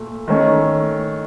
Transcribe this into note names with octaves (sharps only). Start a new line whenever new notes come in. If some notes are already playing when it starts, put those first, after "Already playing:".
Already playing: A#2 A3
D#3 A3 C#4